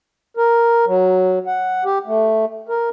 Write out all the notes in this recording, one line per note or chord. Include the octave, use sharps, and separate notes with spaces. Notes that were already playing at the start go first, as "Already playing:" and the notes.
A#4
F#3
F#5
G4
A3
A#4